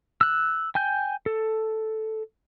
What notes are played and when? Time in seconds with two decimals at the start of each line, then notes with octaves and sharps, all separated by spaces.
0.21 E6 F#6
0.75 G5 G#5 G6
1.26 A4